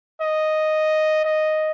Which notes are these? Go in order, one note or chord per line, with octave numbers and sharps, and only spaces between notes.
D#5
D#5